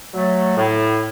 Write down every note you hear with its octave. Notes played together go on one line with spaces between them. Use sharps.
F#3 A3
A2